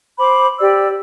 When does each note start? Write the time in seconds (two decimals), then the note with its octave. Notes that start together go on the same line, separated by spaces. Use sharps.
0.19 C5 B5 D6
0.59 G4 D5 E6